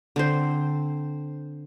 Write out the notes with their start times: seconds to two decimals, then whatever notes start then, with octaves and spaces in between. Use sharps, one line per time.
0.16 D3 C4 C5